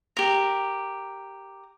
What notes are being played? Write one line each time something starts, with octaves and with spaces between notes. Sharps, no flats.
G4 A#4